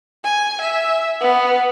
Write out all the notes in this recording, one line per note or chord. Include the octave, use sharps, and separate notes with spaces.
G#5
E5
B3